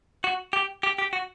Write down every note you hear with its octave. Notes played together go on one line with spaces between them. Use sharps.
F#4
G4
G4
G4
F#4